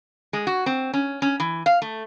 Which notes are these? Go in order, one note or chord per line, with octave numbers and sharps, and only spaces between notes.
G#3
F#4
C4
C#4
C#4
E3
F5
A3